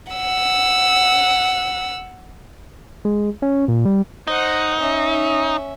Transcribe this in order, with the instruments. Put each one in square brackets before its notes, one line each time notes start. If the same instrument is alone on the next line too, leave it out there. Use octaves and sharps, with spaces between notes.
[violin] F#5 E6
[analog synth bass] G#3
C#4
A#2
G3
[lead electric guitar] D#4 [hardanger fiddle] C5 F#5
[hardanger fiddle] C#4 E5